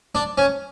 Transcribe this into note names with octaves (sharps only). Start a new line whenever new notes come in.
D4
C#4